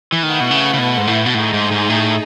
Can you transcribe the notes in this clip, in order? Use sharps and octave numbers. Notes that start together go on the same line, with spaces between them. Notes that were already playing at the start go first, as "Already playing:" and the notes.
E3
D#3 A3 E4 B4 F#5
B2
C#3
C#3
B2
G#2
A2
B2
A2 A3 D#4 G#4
G#2
G#2
A2